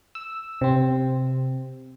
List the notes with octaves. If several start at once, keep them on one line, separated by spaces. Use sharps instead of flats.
E6
C3 C4